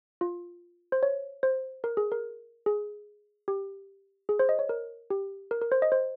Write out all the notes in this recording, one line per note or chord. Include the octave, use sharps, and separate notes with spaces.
F4
C5
C#5
C5
A#4
G#4
A#4
G#4
G4
G#4
C5
D#5
C#5
A#4
G4
A#4
A#4
C5
D#5
C5